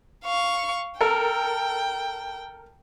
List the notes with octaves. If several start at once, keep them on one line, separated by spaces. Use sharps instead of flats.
F5 C#6
A4 A#4 G5